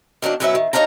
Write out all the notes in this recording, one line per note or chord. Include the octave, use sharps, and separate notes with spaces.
D#3 F#3 A#3 D4
F#2 B2 F#3 C#4 B4 E5
D#3
G2 D#4 C#5 F5 A5 A#5